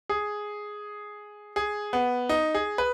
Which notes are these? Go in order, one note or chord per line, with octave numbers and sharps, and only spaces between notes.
G#4
G#4
B3
D#4
G#4
B4